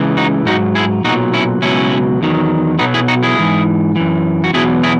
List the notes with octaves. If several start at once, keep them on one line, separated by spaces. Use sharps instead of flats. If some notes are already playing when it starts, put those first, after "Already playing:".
Already playing: C#2 C#3 E3
D#4 F#4
G#2 F#3 D#4 F#4
E4 G#4
B1 A#2 F#3 D#4 F#4
C#4 E4
C#2 B2 F#3 C#4 E4
E2 D#3 F#3
B1 B2 F#3 B3 D#4
E4 G#4
D#4 F#4
E4 G#4
G#2 E3
F#2 E3
F#4
E2 B2 F#3 E4 G#4
E4 G#4